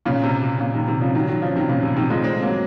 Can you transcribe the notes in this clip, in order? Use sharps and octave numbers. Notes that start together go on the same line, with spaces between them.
A#2 C#3
C3
C3
A#2 C#3
C3 D#3
C3 D#3
C#3 F3
D#3 F#3
D#3 F#3
C#3 F3
C3 D#3
A#2 C#3
C3
C3 D#3
F3 G#3
G#3 C4
F#3 A#3